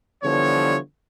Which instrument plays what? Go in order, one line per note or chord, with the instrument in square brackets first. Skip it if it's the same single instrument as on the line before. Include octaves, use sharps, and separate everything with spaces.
[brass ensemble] D3 E3 F3 G3 B3 C#5